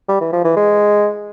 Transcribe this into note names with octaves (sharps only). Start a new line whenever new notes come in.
G3
E3
F3
E3
G#3